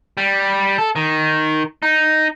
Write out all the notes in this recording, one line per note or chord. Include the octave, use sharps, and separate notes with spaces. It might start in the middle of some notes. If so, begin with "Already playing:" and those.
G3
A4
D#3
D#4